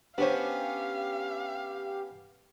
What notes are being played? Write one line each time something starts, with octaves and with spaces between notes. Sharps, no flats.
B3 C#4 D4 G4 C5 F5